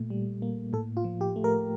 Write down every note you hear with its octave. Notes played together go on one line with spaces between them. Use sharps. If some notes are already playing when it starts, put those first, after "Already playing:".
Already playing: A#2 A3
G3
A#3
A2 A4
F4
F3
G4
A3
A#4